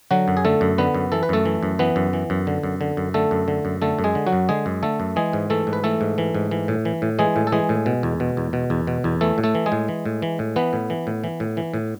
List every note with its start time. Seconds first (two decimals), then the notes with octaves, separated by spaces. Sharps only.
0.11 D3 F#3 F#4
0.28 F#2
0.37 G#4
0.45 D3 A3 A4
0.61 F#2
0.78 D3 B3 B4
0.94 F#2
1.12 E3 A4
1.23 B4
1.29 F#2 A3 A4
1.45 E3
1.63 F#2
1.79 E3 B3 B4
1.96 F#2
2.13 E3
2.30 F#2
2.47 D3
2.63 F#2
2.81 D3
2.97 F#2
3.14 D3 A3 A4
3.31 F#2
3.48 D3
3.65 F#2
3.82 D3 A3 A4
3.99 F#2
4.04 G#3 G#4
4.15 D3
4.27 F#3 F#4
4.32 F#2
4.49 D3 G#3 G#4
4.66 F#2
4.83 D3 A3 A4
5.00 F#2
5.16 E3 G#3 G#4
5.33 G#2
5.50 E3 A3 A4
5.67 G#2
5.73 B4
5.84 E3 A3 A4
6.01 G#2
6.18 E3
6.35 G#2
6.51 E3
6.68 A2
6.85 E3
7.02 A2
7.19 E3 G#3 G#4
7.36 A2
7.47 A4
7.52 E3 G#3 G#4
7.69 A2
7.86 B2
8.03 E2
8.20 B2
8.37 E2
8.53 B2
8.70 E2
8.87 B2
9.04 E2
9.21 E3 A3 A4
9.38 A2
9.44 A3 A4
9.55 E3
9.66 G#3 G#4
9.72 A2
9.88 E3
10.06 A2
10.22 E3
10.39 A2
10.56 E3 B3 B4
10.73 A2
10.90 E3
11.07 A2
11.24 E3
11.40 A2
11.57 E3
11.74 A2